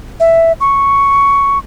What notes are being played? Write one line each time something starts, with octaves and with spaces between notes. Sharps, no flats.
E5
C#6